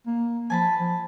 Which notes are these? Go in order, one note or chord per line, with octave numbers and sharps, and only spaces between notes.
A#3
F3 G#5 A5 B5
F3